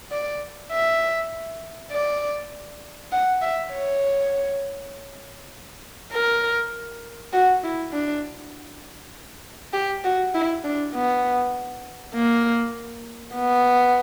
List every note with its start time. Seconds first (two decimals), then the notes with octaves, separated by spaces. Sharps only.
0.11 D5
0.72 E5
1.92 D5
3.12 F#5
3.42 E5
3.72 C#5
6.13 A#4
7.33 F#4
7.64 E4
7.93 D4
9.74 G4
10.04 F#4
10.34 E4
10.64 D4
10.94 B3
12.15 A#3
13.36 B3